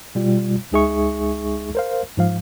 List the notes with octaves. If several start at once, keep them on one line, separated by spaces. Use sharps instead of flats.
B2 G3 F4
C#2 G#3 D#4 G#4 E5 C#6
A#4 C5 F5
G#2 F3 F5